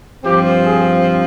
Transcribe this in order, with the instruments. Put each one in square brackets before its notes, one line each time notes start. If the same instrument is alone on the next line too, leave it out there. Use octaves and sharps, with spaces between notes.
[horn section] G2 F3 C4 G4
G#4